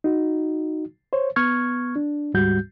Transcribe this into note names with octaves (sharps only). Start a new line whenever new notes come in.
D#4 F#4
C5 C#5
B3 C#6 F6 G#6
D4
D2 G#2 G3 F#4 G6